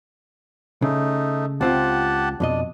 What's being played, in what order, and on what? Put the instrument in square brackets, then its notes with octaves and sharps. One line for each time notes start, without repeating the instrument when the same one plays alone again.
[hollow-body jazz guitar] C#3 [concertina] A3 D#4
[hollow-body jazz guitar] C#2 C4 F4 [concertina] G4 F#5 A5
[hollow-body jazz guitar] F2 B2 D#5 [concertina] D4